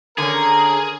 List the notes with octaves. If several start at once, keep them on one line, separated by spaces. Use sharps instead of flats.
D3 C#4 G#4 A#4 A#5